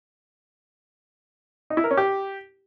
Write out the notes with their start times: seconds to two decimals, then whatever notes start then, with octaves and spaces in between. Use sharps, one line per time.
1.70 D#4
1.77 E4
1.84 A#4
1.91 C#4
1.97 G4